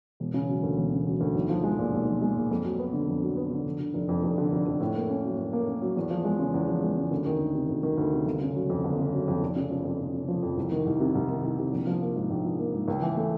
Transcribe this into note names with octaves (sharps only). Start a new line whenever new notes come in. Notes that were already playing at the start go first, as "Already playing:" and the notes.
E1
C#3
F#3
D2
E1
C#3
F#3
D2
B1
F3
G#3
A#2
B1
F3
G#3
A#2
F2
F#3
B3
D3
F2
F#3
B3
D3
F1
D3
F1
F2
F1
D3
F1
F2
A2
A#3
C#4
F#3
A2
A#3
C#4
F#3
E2
F3
G#3
C#3
E2
F3
G#3
C#3
D2
D#3
D2
C3
D2
D#3
D2
C3
G1
C#3
F#3
F2
G1
C#3
F#3
F2
F1
C#3
F3
F2
F1
C#3
F3
F2
C2
D#3
C2
C3
C2
D#3
C2
C3
A#1
F3
A#3
G#2
A#1
F3
A#3
G#2
C#2
E3
A3